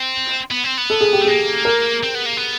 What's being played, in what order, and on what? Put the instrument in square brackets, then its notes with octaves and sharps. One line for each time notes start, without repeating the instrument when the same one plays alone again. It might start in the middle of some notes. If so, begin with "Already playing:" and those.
Already playing: [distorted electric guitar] C4
B3
C4
B3
[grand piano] A4
G#4
G4
[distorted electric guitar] A3
[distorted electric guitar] A#3 [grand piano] G#4
[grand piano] A#4
[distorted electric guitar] C4
B3
A#3
B3